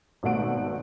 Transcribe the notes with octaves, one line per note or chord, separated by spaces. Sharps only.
G#1 B2 A3 F#5 D7